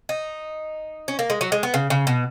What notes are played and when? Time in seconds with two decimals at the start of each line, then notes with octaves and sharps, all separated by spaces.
0.09 D#4
1.08 C#4
1.19 A#3
1.30 G#3
1.41 F#3
1.52 G#3
1.63 B3
1.74 C#3
1.90 C#3
2.07 B2